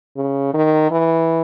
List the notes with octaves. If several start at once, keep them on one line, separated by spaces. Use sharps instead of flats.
C#3
D#3
E3